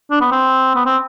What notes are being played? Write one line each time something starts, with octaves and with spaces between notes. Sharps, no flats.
D4
B3
C4
B3
C4